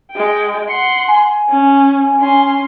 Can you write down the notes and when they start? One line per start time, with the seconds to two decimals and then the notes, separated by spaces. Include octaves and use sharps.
0.11 G#3 G5
0.69 F#5 C6 C#7
1.08 G#5
1.49 C#4
2.19 C#4 C6